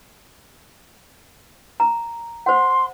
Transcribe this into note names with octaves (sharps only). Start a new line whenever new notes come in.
A#5
C5 F#5 C6